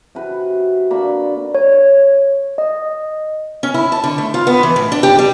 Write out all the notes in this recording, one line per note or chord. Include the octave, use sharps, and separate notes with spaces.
C3 F#4 B4
D3 A#3 B5 C#6
C#5
D#5
C#4
E4
A5
D3
A3
F4
B3
E3
A2
D4
G4
G3